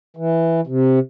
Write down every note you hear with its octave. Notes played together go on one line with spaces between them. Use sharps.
E3
C3